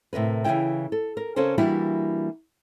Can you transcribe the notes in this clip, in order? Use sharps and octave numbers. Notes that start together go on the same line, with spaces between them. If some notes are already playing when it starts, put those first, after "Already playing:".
A2 C3 A#4 B4
C#3 E3 E4 G5
A4
A#4
C#3 C#4 A4 A#4 C5
E3 G3 A#3 D4 E4 F#4